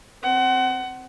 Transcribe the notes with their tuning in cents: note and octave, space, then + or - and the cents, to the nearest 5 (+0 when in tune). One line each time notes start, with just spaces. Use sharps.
C4 +0 F#5 +30